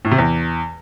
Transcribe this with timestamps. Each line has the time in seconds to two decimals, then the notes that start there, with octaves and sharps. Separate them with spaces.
0.05 A2
0.12 C3
0.18 E2